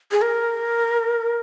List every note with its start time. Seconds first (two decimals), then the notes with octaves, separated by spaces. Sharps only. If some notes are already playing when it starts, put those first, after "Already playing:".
0.12 G#4
0.22 A#4